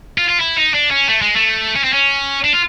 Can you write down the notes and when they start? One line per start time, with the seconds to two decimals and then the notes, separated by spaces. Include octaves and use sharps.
0.18 F4
0.29 F4
0.40 E4
0.58 D#4
0.75 D4
0.91 C#4
1.08 A3
1.22 G#3
1.36 A3
1.76 C#4
1.84 C4
1.93 C#4
2.44 D4
2.53 F4